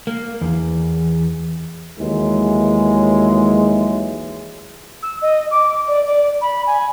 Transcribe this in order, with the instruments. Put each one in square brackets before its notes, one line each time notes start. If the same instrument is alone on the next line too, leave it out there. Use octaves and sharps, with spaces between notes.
[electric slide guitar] A#3
E2
[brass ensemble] D#2 E3 F#3 G#3
[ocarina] E6
D#5
D6
D5
D5
B5
G#5